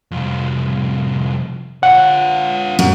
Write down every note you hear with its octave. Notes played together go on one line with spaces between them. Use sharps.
C2 F2
F4 C#5 F#5
F#2